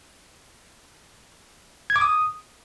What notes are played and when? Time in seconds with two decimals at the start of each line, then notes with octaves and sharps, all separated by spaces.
1.90 G#6
1.96 D6
2.01 D#6